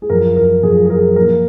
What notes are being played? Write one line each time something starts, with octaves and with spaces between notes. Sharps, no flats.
G#4
F#2 F3 A#4
A#4
F#2 F3 G#4
G#4
A#4
A#2 F3 A#4